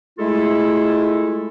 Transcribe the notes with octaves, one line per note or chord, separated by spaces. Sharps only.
G#3 A3 E4 F4 G#4 A4